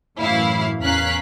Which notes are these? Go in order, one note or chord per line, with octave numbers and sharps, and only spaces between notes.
F#2 A2 E3 E4 F5
E2 C#4 A#4 F5 F#6 B6